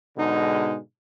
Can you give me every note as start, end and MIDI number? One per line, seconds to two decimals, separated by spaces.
0.17 0.79 44
0.17 0.79 47
0.17 0.79 50
0.17 0.79 56
0.17 0.79 63